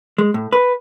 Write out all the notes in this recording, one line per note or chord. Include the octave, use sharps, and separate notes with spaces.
G#3
A2
B4